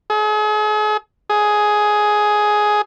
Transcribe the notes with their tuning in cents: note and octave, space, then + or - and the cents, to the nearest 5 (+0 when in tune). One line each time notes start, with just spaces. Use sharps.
G#4 +40
G#4 +10